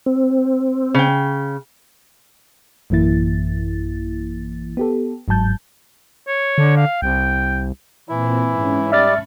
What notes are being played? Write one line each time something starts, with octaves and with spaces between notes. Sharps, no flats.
C4
C#3 G5
A1 F#2 E3 A#3 E4 A6
B3 G4 A4
G1 G#2 F#3 A5 G6
C#5
D3
F5
C2 G5
A#2 E3 C4 E4
G#2 C#4
G3 D5 E5 A5 B5 C#6 F6 A6